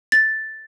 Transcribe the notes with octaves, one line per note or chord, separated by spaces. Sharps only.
A6